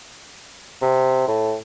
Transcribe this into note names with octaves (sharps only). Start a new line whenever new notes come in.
C3
A2